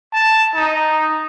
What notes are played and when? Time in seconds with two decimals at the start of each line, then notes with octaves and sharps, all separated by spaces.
0.13 A5
0.55 D#4